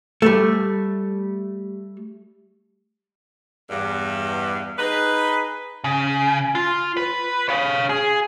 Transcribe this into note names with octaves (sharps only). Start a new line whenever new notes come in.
G3 A3
E2 G2
D#4 G#4 B4
C#3
F4
B4
C#5 F5
G#4